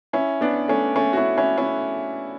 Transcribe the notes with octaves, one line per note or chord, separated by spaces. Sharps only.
C#4 E4
B3 D4
A3 C#4
A3 C#4
F#4
C#4 E4
C#4 E4
C#4 E4